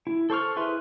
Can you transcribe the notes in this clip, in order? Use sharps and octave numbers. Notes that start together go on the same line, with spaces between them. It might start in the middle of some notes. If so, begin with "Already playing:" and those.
E4
A4 C5 C#6 F6
E4 G#4 B4 E5 C6